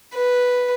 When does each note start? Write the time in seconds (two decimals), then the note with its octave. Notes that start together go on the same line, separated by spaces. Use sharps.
0.15 B4